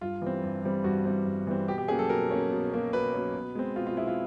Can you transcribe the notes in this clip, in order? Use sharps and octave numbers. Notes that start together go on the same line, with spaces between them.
G2 F4
E3 G3 C4
G2
E3 G3 C4
G2 F#4
E3 G3 C4
G2
E3 G3 C4
B2 G4
G4
F#3 A#3 C#4 G#4
A4
B2 A#4
F#3 A#3 C#4
B2
F#3 A#3 C#4
B2 B4
F#3 A#3 C#4
B2
G#3 C4
B2 F4
F4
G#3 C4 E4
F4